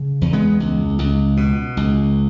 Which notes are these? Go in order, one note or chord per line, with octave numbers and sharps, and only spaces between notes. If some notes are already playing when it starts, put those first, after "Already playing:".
Already playing: C#3
E2
G#3 B3
C#2
C#2
B2
C#2